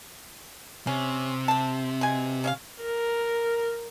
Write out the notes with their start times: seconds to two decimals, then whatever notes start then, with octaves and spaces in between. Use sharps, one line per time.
0.87 C3 C#4
1.48 C4 A5
2.01 B2 G#5
2.44 C#4 E5 F5
2.83 A#4